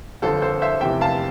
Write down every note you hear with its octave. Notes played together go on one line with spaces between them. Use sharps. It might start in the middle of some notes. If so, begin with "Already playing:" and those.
G1 F2 D3 A4 C5
A4 C5
C5 E5
F1 E2 C3 E5 G5
F5 A5